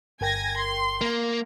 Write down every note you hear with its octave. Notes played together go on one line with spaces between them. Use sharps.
G1 A#4 G5 G#5 G#6 A#6
C6
A#3